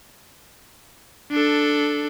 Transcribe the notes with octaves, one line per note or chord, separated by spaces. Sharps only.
D4 A4